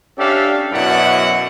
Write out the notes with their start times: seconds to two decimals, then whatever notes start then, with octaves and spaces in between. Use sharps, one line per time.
0.18 C#4 D4 G4 A4 E5 F5
0.73 F#2 B2 E4 D5 E5 F#5